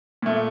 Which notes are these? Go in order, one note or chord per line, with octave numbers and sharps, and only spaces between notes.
A#2 A3